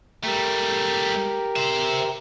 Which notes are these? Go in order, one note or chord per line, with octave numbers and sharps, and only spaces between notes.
G3 A3 G4 A#4
C5 E5